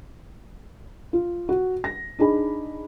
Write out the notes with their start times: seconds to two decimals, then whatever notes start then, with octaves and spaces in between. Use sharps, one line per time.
1.13 F4
1.49 F#4
1.84 A#6
2.19 D4 D#4 G#4 B5